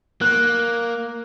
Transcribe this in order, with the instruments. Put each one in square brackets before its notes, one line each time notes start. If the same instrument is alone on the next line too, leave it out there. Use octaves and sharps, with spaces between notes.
[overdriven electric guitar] A#3 [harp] F#6